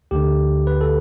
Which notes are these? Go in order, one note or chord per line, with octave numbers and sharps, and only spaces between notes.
D2 D3 G4
B4
A4